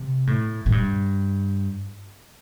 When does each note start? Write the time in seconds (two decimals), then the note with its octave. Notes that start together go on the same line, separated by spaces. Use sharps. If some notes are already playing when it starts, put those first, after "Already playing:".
Already playing: C3
0.27 A2
0.66 A2
0.72 G2